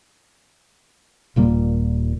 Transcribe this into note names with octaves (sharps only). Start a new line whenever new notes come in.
D#1 A#2 G3 A#3